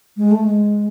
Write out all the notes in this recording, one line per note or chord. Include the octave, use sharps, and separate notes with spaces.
G#3
A3
G#3